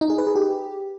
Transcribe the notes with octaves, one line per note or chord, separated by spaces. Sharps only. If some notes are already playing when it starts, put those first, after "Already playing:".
D#4
G#4
B4
G#4
G4